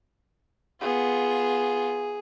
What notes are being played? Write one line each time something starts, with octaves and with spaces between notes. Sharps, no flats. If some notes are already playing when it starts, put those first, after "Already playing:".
B3 F4 G#4